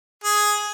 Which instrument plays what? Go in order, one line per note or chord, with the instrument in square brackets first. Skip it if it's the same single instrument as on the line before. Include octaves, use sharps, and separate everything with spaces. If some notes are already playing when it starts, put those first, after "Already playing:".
[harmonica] G#4